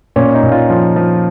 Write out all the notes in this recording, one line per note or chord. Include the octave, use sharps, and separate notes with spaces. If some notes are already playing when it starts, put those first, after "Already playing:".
A#2 C#4
D#4
A#2
F4
F3
F3